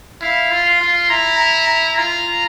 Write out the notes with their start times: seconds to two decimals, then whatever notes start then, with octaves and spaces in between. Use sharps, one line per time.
0.21 E4 F5
0.51 F4
0.65 C6
0.81 F4
1.09 E4 A#5
1.38 A#5
1.69 A#5
1.98 F4 A#5